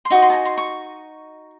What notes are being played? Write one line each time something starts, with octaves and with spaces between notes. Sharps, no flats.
C6
D#4 F#4 D#5
C6
A5
G#5
C6
C#6